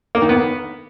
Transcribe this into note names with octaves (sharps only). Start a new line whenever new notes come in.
A#3
D#3
B3